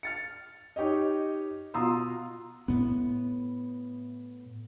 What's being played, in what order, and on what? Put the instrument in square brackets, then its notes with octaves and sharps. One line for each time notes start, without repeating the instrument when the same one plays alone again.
[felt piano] F6 A6 C#7
D#4 G4 C#5 D#5
B2 F4 A#5 C6 D#6 E6
[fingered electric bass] A2 B3